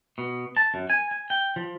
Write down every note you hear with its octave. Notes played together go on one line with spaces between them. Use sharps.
B2
A5
F#2
G#5
G#5
G5
F3